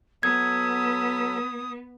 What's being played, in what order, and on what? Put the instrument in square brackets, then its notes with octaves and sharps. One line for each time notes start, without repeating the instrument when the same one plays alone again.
[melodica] F#3 A4 [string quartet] B3 [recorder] D#6 [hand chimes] G#6